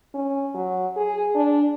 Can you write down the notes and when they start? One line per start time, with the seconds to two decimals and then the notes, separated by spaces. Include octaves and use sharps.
0.14 C#4
0.55 F#3
0.97 G#4
1.35 D4